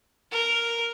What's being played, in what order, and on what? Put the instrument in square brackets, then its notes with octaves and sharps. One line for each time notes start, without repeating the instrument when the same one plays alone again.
[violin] A#4